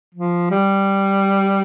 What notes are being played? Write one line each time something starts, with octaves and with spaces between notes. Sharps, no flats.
F3
G3